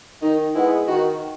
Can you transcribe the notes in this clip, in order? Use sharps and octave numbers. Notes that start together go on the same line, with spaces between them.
D#3 D#4
G#3 B3 E4
D#3 F#4